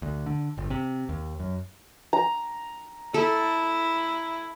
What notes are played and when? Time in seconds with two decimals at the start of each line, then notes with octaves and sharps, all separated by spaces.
0.02 D2
0.26 D3
0.58 G1
0.70 C3
1.09 D#2
1.40 F#2
2.13 A#5
3.14 E4 A4